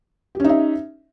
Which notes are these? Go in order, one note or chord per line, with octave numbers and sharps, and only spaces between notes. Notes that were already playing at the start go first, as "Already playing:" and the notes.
C#4 D#4 G4 E5